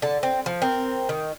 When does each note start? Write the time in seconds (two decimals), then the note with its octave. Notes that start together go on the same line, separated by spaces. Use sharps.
0.02 D3 A5
0.23 C4
0.46 F3
0.62 C4 A#4
1.09 D#3